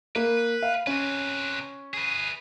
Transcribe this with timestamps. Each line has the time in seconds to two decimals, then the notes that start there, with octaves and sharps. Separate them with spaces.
0.16 A#3 B4
0.62 F5
0.87 C3 C#4 B4
1.94 G#4 B4